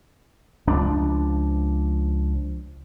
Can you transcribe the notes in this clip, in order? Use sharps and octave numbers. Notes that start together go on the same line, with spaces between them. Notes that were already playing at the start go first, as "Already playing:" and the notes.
C#2 F3 D4